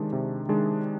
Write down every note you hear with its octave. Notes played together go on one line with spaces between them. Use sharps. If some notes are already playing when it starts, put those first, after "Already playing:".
Already playing: C3 D#3 G#3 D4
C3
D#3 G#3 D4 G#4